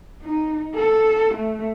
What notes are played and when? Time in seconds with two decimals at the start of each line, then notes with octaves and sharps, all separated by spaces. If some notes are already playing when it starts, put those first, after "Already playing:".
0.22 D#4
0.75 A4
1.35 A3